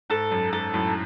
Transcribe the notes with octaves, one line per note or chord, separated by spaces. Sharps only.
G#2 A4
F#2
G#2 A4
F#2 A2